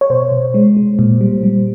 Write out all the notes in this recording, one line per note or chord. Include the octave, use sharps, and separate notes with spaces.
C#5
B2 C5
B2
G#3
G#3
A#2
G3
G3